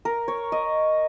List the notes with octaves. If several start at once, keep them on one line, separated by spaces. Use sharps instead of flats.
A#4
C#5
D#5